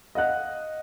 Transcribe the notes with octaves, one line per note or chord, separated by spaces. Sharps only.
D#5 F5 F#5 F#6